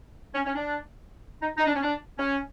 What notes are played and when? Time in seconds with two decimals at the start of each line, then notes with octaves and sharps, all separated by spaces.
0.34 C#4
0.45 C#4
0.55 D4
1.42 D#4
1.58 D#4
1.66 D4
1.75 C#4
1.82 D4
2.18 C#4